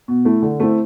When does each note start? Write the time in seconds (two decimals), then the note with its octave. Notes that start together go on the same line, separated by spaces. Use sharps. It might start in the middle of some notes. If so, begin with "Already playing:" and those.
0.08 B2
0.25 A3 E4
0.42 D3
0.60 A3 C4 E4